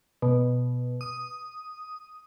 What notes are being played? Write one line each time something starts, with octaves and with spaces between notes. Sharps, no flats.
B2
D#6